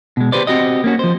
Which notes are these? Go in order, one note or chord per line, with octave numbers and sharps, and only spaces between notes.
B2 G#3
G4 B4 C5 D5
C4 F#4 G4 D#5
A#3 C#4 F#4
F3 C5